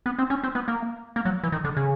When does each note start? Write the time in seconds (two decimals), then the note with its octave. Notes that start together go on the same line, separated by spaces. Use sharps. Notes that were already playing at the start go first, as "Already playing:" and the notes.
0.06 B3
0.19 C4
0.30 C#4
0.43 C4
0.55 B3
0.68 A#3
1.16 A#3
1.25 F#3
1.44 E3
1.52 D#3
1.65 D3
1.77 C#3